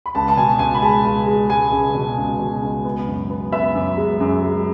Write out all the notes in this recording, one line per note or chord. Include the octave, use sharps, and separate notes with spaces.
B5
C#2 A5
A5
B2 G#5
C#2 G#5
B5
G#3 A5
C#2
G#3
G#3 G#5
C#2
B2
C#2
B2
C#2
B3
F#2
B3
B3 E5
F#2
G#3
F#2
G#3